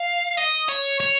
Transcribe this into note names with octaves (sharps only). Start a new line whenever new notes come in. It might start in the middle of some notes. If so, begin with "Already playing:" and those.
Already playing: F5
D#5
C#5
C#5